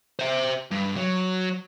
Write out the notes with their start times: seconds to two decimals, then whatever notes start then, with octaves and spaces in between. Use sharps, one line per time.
0.19 C5 E5
0.71 G2
0.96 F#3